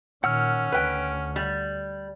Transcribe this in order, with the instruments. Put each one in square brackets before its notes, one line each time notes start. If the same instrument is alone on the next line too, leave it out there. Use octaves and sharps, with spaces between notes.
[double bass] A#2 D#3 [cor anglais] C#4 [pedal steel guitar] F#5 E6 F6
[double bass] D2 [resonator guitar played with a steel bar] B4 G5
[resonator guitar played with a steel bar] G3